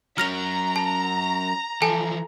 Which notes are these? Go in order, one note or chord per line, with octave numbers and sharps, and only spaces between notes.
F#3 C#4 A#5 F6 A#6 F7
A5
E3 F3 A4 G#5 A5